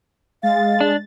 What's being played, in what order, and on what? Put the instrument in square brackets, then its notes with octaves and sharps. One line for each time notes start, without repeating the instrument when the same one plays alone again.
[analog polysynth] G#3 A6 [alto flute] F5
[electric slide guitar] D4